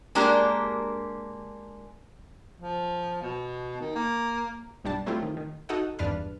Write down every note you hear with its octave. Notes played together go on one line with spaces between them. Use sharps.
G#3 A#3 D4 G4 A#4
F3
B2
D#3
A#3
B1 G2 G3 D4 A5
F#3 A3 C4 E4 F4 G4
D#3
D#3
D#4 F#4 A4 D#5 F#5
G#1 E2 G2 D4 B4 F6